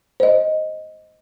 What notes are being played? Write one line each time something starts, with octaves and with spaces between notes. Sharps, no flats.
C5 D#5